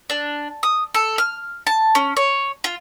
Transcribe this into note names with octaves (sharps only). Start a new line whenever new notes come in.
D4
D#6
A4
F6
A5
C#4
C#5
F4